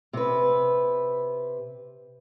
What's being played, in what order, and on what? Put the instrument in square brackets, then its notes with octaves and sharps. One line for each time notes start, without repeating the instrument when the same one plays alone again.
[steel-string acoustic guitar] C3 B4